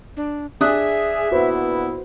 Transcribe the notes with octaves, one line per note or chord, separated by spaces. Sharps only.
D4
D4 G#4 E5 D#6 F#6
A#2 B3 E4 F#4 B4 C5